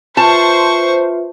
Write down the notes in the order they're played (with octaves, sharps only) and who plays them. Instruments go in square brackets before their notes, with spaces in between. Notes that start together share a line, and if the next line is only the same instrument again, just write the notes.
[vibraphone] F4 B4 E5 [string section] C5 [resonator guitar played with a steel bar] A5 [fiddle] C#6